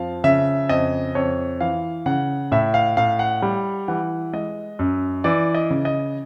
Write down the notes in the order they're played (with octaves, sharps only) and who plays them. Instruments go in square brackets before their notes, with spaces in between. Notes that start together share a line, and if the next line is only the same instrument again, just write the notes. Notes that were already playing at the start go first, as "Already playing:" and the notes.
Already playing: [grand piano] F2 F3 F5
C#3 E5
F2 D#5
F2 C#5
E3 F5
C#3 F#5
A2 E5
F5
A2 F5
F#5
G3
E3 F#5
G#3 D#5
F#2
E3 D5
D#5
C#3
D#5